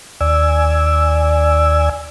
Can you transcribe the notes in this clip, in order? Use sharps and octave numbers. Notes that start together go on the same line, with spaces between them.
D#2 D5 G#5 E6